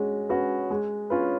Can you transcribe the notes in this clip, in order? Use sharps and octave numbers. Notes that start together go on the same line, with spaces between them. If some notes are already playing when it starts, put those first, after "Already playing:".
Already playing: G#3 C#4 F#4
C#4 F#4 B4
G#3
C#4 F4 B4